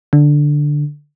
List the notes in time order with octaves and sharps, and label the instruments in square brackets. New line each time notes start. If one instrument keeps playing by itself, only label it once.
[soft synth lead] D3